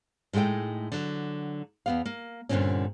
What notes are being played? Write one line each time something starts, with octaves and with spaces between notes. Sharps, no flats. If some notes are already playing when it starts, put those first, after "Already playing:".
A2 G#3 A3 D#4 G5
D3 F#3
E2 B3 F5
A#3
G2 A#2 D3 D#3 C4 C#4